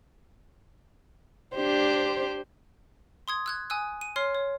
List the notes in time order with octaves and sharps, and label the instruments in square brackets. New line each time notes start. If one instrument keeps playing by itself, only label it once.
[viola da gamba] D4 G4 C5
[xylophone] C6 D#6 G#6
E6 F#6 G#6
G#5 D#6 E6 F#6
D#7
C#5 C6 F6 C7
C#5